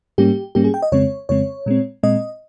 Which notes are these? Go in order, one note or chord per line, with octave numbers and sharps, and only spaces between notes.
G#2 G3 A#3 C#4 G4
G#2 G3 A#3 C#4 G4
G#4
G5
D#5
F2 C#3 G#3 C4 C#5
F2 C#3 G#3 C4 C#5
A#2 G#3 C4
A#2 G#3 C4 D#5